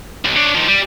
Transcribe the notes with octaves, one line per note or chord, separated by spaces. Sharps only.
B1
D4 C#5
D#3 F3
G3